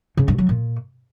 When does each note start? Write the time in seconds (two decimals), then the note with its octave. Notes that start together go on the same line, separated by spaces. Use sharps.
0.17 C#3
0.28 G2
0.38 F#3
0.49 A#2